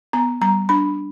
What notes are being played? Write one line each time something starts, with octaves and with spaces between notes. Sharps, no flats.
B3 A#5
G3 A#5
D4 B5